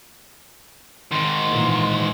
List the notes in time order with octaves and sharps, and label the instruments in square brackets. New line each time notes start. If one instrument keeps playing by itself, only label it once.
[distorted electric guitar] G#2 D#3 [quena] C6
[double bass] A#2 E3